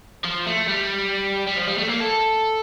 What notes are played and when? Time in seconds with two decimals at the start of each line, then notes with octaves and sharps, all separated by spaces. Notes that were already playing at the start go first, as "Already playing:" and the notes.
0.25 F3
0.47 A3
0.68 G3
1.48 G3
1.57 F3
1.68 G3
1.78 A3
1.89 A#3
2.01 A4